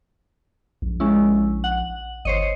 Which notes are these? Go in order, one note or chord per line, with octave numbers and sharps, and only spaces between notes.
A#1
G#3 C#4 E4
F#5
G1 C5 C#5 D#5